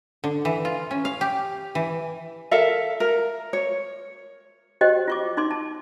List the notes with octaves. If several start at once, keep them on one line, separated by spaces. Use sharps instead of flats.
D3
E3
F4
C#4
F5
G4
E3
A4 A#4 E5 F5
A#4
C#5
F#4 G4 C5 D#5 G5
F4 C#6 D6
D#4 C6 D6
A5